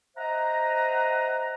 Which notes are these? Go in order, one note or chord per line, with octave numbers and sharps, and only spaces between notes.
C5 D#5 E5 F#5 A#5